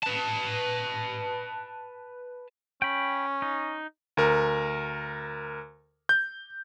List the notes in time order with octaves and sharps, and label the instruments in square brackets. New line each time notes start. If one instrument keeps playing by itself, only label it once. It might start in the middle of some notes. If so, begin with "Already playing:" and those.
[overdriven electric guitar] B4 A5
[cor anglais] C#4 [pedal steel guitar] G5 B5
[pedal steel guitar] D#4
[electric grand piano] D2 A#4
G6